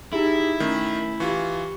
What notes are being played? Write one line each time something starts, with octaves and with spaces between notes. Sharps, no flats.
D#4 E4 G4 G#4
D#3 A3 C#4
E3 F4 G4 C#6